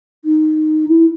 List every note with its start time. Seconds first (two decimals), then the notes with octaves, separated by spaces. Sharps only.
0.25 D#4
0.88 E4